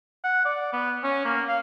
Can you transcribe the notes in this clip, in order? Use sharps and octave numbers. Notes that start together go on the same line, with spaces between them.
F#5
D5
B3
C#4
A#3
F5